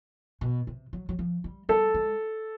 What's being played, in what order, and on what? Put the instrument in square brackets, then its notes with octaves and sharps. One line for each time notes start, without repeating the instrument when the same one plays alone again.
[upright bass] B2
C3
F#3
F#3
F3
G3
[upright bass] G3 [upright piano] A4
[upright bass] G#3